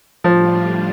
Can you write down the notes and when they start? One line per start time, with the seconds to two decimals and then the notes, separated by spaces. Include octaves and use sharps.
0.24 A2 F3 G3 D4 F4